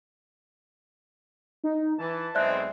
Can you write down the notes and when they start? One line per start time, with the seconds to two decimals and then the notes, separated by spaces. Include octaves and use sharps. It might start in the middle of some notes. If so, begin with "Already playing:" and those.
1.64 D#4
1.98 E3 A5
2.35 B1 G#3 C4 D5 E5 F#6